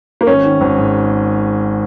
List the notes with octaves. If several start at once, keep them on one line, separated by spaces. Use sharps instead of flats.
A#3
G#1 C#4
D#3
G#1
G#2